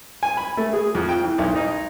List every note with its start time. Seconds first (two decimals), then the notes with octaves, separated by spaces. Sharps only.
0.23 G#5
0.37 B5
0.57 A3
0.73 G#4
0.95 F2
1.09 G5
1.24 E3
1.38 B1
1.55 D#4